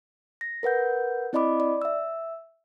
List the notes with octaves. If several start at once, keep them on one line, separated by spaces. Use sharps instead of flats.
A#6
A#4 B4 F#5 G6
C4 E4 D5 D#5 B5 D6
D5
E5 E6